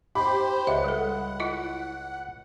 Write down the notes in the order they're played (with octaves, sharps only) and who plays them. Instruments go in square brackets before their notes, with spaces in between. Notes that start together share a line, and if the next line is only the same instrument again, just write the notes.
[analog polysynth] G4 C5 [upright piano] B5
[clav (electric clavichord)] C#2 [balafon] E5 [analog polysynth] F#5
[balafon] G3 A4
E4 F4 D#5